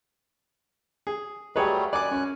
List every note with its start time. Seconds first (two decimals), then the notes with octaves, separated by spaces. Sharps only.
1.07 G#4
1.56 F#3 G3 A3 G4 G#4 B4 C#5 D#5
1.93 F#2 D5 G#5 D6 F#6
2.11 C#4